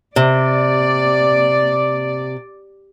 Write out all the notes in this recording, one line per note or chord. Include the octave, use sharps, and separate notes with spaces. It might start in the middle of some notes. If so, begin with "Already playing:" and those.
C3 D5